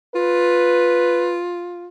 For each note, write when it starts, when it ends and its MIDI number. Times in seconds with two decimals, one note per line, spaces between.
0.15 1.87 65
0.15 1.39 71